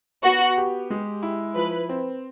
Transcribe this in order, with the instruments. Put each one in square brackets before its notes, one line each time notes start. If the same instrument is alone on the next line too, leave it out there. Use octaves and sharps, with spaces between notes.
[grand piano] B3 [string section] F#4
[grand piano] G4
G#3
E4
[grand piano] F3 [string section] B4
[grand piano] C4